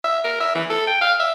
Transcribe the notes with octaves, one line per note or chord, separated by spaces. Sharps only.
E5
A#4
E5
E3
A4
G5
F5
E5